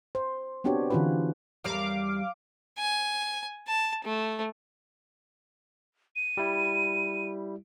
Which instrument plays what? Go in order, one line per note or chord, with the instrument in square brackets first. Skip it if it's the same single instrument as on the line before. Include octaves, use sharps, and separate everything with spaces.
[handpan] C5
B3 C4 D4 F#4 G4 C#5
D3 E3 C#4 F4 F#4 B4
[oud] E2 G3 A#4 [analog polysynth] F5 D6
[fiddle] G#5
A5
A3
[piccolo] D#7
[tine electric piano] G3 E4